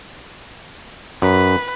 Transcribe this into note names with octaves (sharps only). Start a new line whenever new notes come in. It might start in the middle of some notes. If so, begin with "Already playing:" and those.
F#2 B4